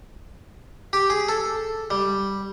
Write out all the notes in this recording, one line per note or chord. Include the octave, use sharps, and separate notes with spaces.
G4
G#4
A4
G3